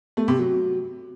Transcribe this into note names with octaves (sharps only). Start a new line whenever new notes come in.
A3
C3
F#3